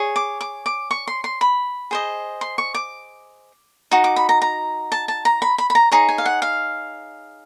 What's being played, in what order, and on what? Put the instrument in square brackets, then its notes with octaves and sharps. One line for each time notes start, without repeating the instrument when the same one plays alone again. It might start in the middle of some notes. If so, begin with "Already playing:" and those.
Already playing: [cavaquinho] G#4 C#5
D6
D6
D6
C#6
C6
C6
B5
G#4 C5 D#5
C6
C#6
D6
D#4 F#4
D6
B5
A#5
A#5
A5
A5
A#5
B5
B5
B5
A#5
D#4 G#4 C#5 A#5
G#5
F5
F#5
F5